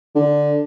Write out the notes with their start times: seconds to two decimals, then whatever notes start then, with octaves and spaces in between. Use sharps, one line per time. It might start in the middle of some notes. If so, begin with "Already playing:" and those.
0.15 D3